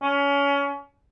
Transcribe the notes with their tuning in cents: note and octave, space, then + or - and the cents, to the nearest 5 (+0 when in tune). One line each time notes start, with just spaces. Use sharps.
C#4 +25